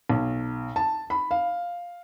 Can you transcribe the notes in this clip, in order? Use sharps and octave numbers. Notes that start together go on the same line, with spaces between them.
B1
A5
B5
F5